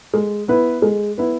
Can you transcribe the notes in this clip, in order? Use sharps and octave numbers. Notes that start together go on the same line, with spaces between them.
G#3
B3 E4 B4
G#3
B3 E4 B4